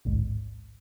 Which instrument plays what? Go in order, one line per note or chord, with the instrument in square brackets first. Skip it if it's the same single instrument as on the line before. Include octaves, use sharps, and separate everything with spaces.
[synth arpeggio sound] A1 D2 G#2